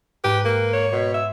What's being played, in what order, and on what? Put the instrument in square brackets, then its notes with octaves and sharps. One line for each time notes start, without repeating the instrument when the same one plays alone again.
[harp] G#2 [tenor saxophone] G4 [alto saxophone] B4
[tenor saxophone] A#3
[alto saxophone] C#5
[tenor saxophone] B2 [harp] C6 G#6 B6
[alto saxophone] E5